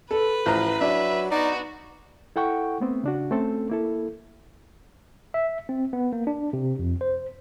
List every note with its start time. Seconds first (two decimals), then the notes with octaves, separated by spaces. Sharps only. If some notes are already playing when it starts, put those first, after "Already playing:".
0.11 A4 B4
0.46 A1 F3 A#5
0.81 F#3 D4 E5
1.31 B3 D#4 F#4 D5
2.36 E4 A4 F#5 G5 C#6
2.81 A3 B3 C4
3.04 C#3 D4 F#4
3.31 A3 C4 C#4 A4
3.70 A#3 E4 A4
5.34 E5
5.69 C4
5.93 B3
6.13 A#3
6.27 D4
6.53 C3
6.79 F2
7.01 C5